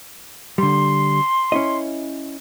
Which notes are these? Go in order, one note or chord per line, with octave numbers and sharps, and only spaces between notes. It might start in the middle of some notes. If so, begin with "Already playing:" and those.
D3 G3 C6
C#4 E4 D#5